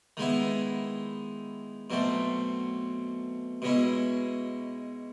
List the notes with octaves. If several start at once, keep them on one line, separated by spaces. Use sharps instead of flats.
D#3 G#3 B3 E4
B2 F#3 A3 C4
B2 G#3 C#4 E4